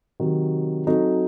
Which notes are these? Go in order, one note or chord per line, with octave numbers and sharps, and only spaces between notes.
C3 D#3 F#3
F#3 C4 D#4 F#4 A4